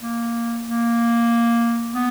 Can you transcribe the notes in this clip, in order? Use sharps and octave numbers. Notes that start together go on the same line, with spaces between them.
A#3
A#3
B3